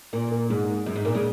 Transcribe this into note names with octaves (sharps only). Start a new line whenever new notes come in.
A#2 A#3
A#3
G#2 G#3
F#2 G#3
G#2
A#2 A#3
C#3 G#3